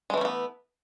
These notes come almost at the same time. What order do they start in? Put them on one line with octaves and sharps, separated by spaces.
G#3 E3 A3 C#4 B3